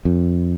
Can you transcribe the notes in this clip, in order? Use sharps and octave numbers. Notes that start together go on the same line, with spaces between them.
F2